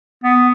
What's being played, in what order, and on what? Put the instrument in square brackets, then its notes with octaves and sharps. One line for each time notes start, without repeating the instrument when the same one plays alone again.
[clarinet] B3